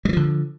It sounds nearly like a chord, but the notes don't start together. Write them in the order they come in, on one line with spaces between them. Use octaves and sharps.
G3 E3 F3 D3